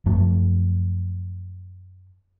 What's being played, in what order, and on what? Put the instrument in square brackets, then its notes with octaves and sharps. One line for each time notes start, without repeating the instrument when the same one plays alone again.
[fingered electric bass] F#2 F3 A3